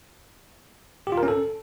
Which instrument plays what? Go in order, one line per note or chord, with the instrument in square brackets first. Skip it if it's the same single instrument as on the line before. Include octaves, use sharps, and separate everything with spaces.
[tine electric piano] G4
F4
A#4
C#4
A4